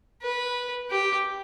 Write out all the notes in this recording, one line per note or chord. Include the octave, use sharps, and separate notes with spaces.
B4
G4